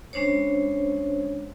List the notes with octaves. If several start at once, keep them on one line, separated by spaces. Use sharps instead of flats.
G#3 C#4 D4 C5 C#5